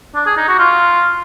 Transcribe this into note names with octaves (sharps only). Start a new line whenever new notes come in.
D4
G#4
D#4
F#4
F4